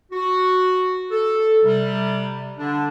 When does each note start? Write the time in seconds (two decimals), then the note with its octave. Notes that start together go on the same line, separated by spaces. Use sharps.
0.12 F#4
1.11 A4
1.63 C3 G3
2.58 D3 D4